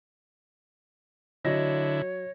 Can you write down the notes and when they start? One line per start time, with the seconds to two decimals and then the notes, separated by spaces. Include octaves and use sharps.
1.45 D3 F#3 E4 C#5 D#5 A#6